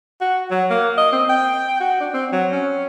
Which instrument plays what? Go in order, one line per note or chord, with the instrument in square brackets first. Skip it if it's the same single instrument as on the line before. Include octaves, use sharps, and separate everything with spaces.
[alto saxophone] F#4
F#3
A#3
D#5
C4
G5
F#4
D4
C4
F#3
C#4